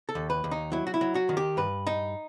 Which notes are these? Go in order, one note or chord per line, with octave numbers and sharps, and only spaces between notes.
A4
D#2
B4
D#2
D#4
F#3 E4
F#4
E4
F#3
F#4
D#3
G4
G2 B4
D#4